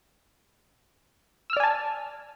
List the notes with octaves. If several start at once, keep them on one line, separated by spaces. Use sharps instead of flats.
D5 G#5 A5 E6 F6